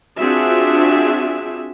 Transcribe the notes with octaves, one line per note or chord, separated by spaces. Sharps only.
C4 D4 F4 F#4 G#4 E5